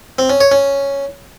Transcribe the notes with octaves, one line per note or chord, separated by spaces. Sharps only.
C4
C#4
C#5
C#4